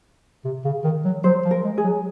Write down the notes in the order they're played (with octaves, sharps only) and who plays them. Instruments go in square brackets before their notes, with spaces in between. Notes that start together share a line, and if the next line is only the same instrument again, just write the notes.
[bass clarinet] C3
C#3
D#3
F#3
[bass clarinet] F#3 [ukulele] C5
[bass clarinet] F3
[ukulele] A#4
[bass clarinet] G#3
[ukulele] G#4
[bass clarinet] F#3